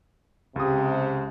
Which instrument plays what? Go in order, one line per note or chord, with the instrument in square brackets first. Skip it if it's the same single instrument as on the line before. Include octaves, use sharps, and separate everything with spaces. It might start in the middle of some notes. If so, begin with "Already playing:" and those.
[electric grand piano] C#2 D#6 [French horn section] C3